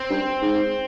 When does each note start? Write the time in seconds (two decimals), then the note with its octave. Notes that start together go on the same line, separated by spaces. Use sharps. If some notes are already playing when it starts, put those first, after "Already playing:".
Already playing: C4
0.10 G2
0.42 G#2